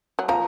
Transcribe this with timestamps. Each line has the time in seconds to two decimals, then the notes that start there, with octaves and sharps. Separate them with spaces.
0.19 F#3
0.28 F3 A#5